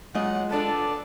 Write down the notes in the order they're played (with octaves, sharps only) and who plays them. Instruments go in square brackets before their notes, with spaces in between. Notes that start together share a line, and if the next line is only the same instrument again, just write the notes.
[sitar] F#3 [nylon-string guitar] G#3 F4 D#5 [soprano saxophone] F#5
[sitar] B3 D4 [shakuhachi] A4 [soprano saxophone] A5